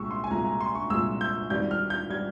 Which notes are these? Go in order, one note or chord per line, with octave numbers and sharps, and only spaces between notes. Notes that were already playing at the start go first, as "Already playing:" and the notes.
Already playing: C2 A#2 G#3 C#6 E6
C6
G#5
C2 A#2 G#3 A#5
A#5
C6
C#6
C2 A#2 G#3 E6
G6
G#1 G#2 G3 G6
F6
G6
G3 G#6